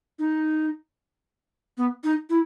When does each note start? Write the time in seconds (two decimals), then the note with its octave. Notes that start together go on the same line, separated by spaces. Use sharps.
0.19 D#4
1.78 B3
2.04 D#4
2.30 E4